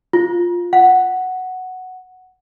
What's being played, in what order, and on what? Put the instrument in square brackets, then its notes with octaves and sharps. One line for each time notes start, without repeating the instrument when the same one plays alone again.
[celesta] F4
F#5